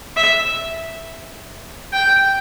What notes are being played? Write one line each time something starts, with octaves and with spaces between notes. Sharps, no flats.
E5
G5